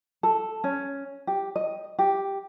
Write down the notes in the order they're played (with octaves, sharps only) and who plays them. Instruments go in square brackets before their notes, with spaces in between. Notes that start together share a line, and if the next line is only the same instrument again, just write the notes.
[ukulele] A4
C#4
G4
D#5
G4